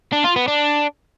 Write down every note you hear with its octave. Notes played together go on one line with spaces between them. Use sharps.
D4
F4
B3
D4